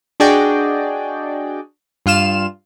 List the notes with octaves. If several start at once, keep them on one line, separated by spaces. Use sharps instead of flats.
D4 F#4 G#4 D5 D#5 G5
G2 F4 F6 E7